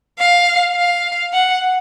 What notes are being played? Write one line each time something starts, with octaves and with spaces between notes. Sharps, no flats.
F5
F5
F#5